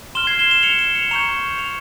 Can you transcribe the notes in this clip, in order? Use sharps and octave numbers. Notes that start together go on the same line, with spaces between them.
C6 F6 E7 G7
G#6 C7
E7 G7
E7 G7
C#7 F7
E7 G7
C#7 F7
A#5 C#6 G6 C#7 F7
C#7 F7